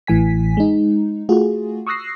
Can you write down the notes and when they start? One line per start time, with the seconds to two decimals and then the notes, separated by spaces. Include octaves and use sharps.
0.07 A1 A2 E3 G#5 B6
0.57 G#3 D#4
1.29 A3 F4 F#4 G#4
1.87 C#6 D#6 E6 F#6 A#6 C7